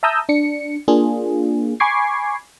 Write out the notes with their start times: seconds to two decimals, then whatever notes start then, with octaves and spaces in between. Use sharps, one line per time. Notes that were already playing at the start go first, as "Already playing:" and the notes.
0.03 E5 A5 A#5 D#6 E6 G6
0.29 D4 C#7
0.88 A#3 D4 F4 G#4
1.80 G#5 B5 C#6 D6 G#6 C7